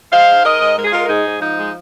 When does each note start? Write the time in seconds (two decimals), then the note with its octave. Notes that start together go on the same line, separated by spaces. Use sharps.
0.12 G#3 C5 F5
0.29 G#2
0.44 G#3 A#4 D#5
0.61 G#2
0.77 G#3 A#4
0.85 G#4
0.93 G#3 F4 A#4
1.05 A#4
1.09 G#2 D#4 G#4
1.25 G#2
1.41 F3 D#4
1.58 G#3